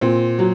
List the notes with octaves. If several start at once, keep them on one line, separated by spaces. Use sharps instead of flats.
A#2 C4
F#3